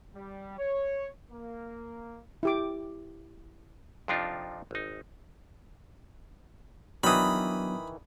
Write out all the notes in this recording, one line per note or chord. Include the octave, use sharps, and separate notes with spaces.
G3
C#5
A#3
E4 G4 D6
F2 C3 F3 D4 D#4 F4
G#1 D#4
D#3 E3 F#3 B3 D4 B5 D#6